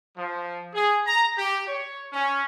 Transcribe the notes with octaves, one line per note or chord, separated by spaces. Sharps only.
F3
G#4
A#5
G4
C#5
C#4